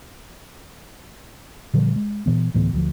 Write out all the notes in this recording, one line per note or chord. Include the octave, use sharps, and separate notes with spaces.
A#2 D3 F3 G3
G#3
A#2 E3 B3
D2 A2 E3 B3
D2 F3